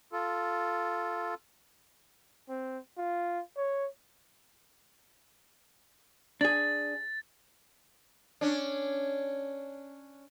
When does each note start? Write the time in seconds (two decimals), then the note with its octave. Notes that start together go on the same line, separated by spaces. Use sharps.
0.12 F4 A4
2.49 C4
2.98 F4
3.56 C#5
6.41 D4 G#4 A6
8.41 C#4 D4